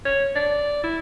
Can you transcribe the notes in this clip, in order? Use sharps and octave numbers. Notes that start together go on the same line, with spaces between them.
C#5
D5
E4